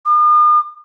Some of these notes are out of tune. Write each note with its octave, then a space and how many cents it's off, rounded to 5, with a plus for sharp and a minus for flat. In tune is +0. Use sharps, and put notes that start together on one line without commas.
D#6 -45